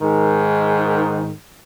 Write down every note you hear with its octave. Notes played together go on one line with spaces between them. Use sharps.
G#2 D#3